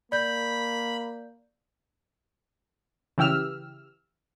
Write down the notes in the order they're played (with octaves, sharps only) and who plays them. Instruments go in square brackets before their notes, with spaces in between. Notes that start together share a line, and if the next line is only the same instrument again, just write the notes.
[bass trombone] A#3 [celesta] D5 G6 [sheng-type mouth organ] B5
[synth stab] C#3 E3 G4 E6 F6